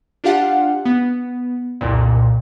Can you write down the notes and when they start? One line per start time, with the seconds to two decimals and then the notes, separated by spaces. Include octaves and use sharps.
0.24 D4 F4 G4 F5 F#5
0.86 B3
1.81 C2 F2 A#2